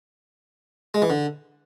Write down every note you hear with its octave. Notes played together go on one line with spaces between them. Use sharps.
G#3
E3
D3